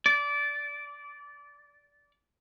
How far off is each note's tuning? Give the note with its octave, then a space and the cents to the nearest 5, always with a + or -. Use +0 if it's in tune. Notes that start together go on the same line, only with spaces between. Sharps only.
D5 -20